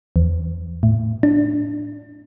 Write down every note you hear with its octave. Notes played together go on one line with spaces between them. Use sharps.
E2
A2
D4